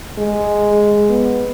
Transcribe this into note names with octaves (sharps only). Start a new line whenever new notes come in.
G#3
B3